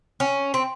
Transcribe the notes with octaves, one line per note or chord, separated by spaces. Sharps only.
C#4
C4